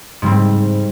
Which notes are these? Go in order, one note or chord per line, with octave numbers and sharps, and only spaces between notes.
G#2 G3 C4